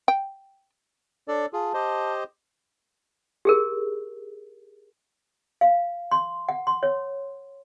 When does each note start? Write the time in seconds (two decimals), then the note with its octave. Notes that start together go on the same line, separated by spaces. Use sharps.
0.08 G5
1.28 D4 A4 C#5 D5
1.53 F4 G#4 A5
1.74 G4 C5 D#5
3.45 G4 G#4 A#4
5.61 F5
6.11 C6
6.49 F#5
6.67 C6
6.83 C#5